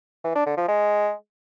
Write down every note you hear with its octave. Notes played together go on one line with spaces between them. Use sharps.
E3
D4
D3
F3
G#3